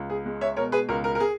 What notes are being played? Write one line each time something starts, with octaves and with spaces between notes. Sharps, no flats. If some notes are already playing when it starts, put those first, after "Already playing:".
Already playing: C#2
G#4
G#3
C#5 E5
B2 A#4 C#5
G#4 B4
C#2 A#4
A#4
A#4
G#4